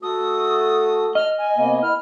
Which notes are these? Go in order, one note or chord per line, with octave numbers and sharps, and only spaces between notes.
A3 F#4 A4 D#6
D#5 F6
G#5
C3 A#3 B3
E4 F6